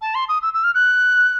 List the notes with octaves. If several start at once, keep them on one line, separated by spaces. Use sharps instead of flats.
A5
C6
D#6
E6
E6
F6
F#6